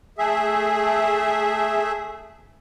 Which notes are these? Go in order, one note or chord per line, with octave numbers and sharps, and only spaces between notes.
A3 G#4 E5